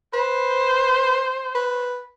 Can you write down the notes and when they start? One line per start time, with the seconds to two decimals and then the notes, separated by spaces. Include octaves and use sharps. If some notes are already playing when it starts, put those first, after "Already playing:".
0.14 B4 C5
1.55 B4